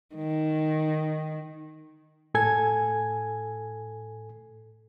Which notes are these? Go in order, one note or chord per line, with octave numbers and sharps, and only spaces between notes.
D#3
A2 A4 G#5 G#6